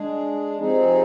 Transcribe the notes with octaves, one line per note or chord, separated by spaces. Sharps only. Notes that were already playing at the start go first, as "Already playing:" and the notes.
Already playing: G#3 D4 G#4
C3 F3 C4 D#4 G#4